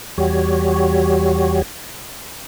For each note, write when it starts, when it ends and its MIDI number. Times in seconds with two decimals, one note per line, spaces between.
0.18 1.62 40
0.18 1.62 55
0.18 1.62 66
0.18 1.62 67
0.18 1.62 73